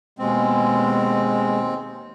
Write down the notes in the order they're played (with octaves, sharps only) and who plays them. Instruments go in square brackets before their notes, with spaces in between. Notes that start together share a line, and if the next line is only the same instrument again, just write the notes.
[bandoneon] D#2 C4 [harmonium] B2 G#3